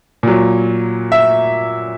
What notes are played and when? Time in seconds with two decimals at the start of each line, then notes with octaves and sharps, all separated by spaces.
0.23 A#2 F#3
1.12 E5